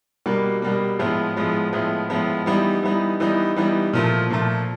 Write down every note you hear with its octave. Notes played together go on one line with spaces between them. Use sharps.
B2 G3 A#3
B2 G3 A#3
A2 F3 G#3 B3
A2 F3 G#3 B3
A2 F3 G#3 B3
A2 F3 G#3 B3
E3 G3 B3 D#4
E3 G3 B3 D#4
E3 G3 B3 D#4
E3 G3 B3 D#4
A#2 F3 A3
A#2 F3 A3